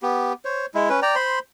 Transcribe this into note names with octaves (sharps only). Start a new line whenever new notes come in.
B3 G4
C5 C#5
G#3 E4
C#4 B4
D5 G5 A#5
C5 B5 C6